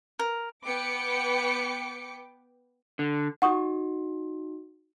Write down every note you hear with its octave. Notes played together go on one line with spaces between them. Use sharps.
A#4
B3 B4 G5 D6 C#7
D3
D#4 F#4 F#5 C#6 D#6